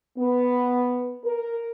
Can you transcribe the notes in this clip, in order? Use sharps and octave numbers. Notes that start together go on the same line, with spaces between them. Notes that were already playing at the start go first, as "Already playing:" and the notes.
B3
A#4